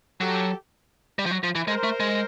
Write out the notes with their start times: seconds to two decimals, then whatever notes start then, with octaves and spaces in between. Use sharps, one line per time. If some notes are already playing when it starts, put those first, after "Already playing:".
0.21 F#3 G4 A4
1.19 G3
1.26 F3
1.31 F#3
1.44 F3
1.55 E3
1.67 G#3 A#4 C5
1.84 A3
2.00 G#3